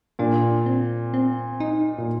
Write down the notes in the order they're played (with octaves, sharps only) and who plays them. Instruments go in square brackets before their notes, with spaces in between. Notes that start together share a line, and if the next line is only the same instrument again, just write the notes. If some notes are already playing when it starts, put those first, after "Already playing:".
[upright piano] A#2 [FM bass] D4
[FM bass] C4
C4
D#4
[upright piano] A#2